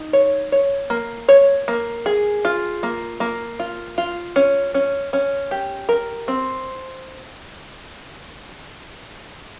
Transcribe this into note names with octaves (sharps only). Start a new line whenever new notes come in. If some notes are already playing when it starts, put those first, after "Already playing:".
Already playing: D#4
C#5
C#5
A#3
C#5
A#3
G#4
F4
A#3
A#3
F4
F4
C#4
C#4
C#4
G4
A#4
C4